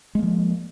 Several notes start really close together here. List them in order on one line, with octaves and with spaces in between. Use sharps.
G#3 A#3 F3